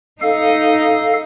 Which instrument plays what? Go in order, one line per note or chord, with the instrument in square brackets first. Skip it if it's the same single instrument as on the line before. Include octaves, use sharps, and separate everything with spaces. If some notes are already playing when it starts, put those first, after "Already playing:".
[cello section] D#4 [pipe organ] A4 F5